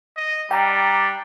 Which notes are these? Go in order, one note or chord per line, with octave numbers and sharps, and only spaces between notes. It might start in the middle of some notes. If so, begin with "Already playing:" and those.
D#5
G3 D4 G5 A#5